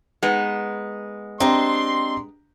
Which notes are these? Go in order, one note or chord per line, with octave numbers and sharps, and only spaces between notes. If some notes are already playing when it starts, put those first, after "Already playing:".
G#3 B3 D#4
C4 D4 G4 D#5 A#5 C6